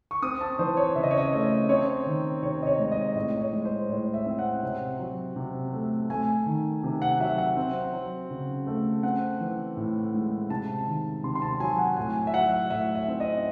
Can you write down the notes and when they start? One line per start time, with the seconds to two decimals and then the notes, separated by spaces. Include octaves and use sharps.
0.11 C#6
0.22 C4 D#6
0.41 A5
0.59 E3 C5
0.77 C#5
0.95 C#3 E5
1.03 D#5
1.11 C#5
1.18 D#5
1.33 A3
1.69 C4 C#5
2.06 D#3
2.43 C3 C#5
2.62 D#5
2.67 C#5
2.79 G#3
2.92 D#5
3.15 A2 D#5
3.41 C#5
3.53 G#3
3.65 C5
3.89 A2 C#5
4.14 E5
4.26 C4
4.39 F#5
4.63 C3
4.99 F#3
5.36 C3
5.73 A3
6.10 A3 G#5
6.46 D#3
6.83 C3
7.02 F#5
7.20 F#3 E5
7.38 F#5
7.56 C4
7.93 F#3
8.31 C#3
8.67 A3
9.03 C4 F#5
9.40 E3
9.77 A2
10.14 G#3
10.50 C3 A5
10.87 D#3
11.24 C3 C6
11.35 C6
11.42 A5
11.60 F#3 G#5
11.78 F#5
11.97 A2 G#5
12.27 E5
12.34 F#3 F#5
12.70 A2 E5
12.95 E5
13.08 C4
13.20 D#5